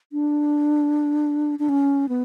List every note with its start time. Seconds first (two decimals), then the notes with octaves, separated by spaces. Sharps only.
0.12 D4
1.59 D4
1.69 C#4
2.09 B3